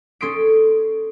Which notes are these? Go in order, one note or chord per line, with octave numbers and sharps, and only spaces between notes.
C#4 A4 C6 D#6 B6 D7